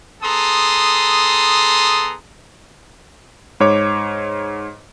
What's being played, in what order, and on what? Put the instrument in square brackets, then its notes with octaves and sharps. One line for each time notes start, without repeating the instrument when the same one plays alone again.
[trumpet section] B3 G#4 A4 A#5 C6 D#6
[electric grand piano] G#2 C#5 D6